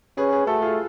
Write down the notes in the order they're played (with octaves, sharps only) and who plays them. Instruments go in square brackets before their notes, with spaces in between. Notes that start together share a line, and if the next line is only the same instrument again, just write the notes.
[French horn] C#4 [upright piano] G#4 B4
[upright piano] G#4 B4
[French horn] A3 [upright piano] F#4 A4
[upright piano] F4 G#4